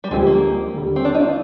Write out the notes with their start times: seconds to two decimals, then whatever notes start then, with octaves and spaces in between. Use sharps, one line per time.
0.04 G3
0.11 D2 D3 F3 G#3 C4 G4
0.27 A#3
0.74 D#2 D3 G3
0.96 C4
1.05 D4
1.15 D#4
1.20 F4